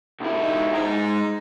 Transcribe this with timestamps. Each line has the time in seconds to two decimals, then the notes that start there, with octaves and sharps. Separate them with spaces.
0.21 B1 E4
0.43 G#3 D#4
0.74 G#3 D#4 G#4 A#5